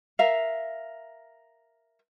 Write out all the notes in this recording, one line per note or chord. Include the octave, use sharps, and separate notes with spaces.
A#4 E5 F5